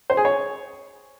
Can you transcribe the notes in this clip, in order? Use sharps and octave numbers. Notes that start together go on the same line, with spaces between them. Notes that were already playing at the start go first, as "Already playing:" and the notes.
C5
G#4
C#5